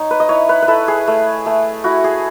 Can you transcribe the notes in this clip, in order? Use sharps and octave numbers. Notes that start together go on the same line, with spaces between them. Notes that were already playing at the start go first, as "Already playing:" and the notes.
Already playing: D#4 C#5
B4
D#5
E4 C#5
B4
B4
E4 A4
G#4
A3
A3
E4 F#4
G#4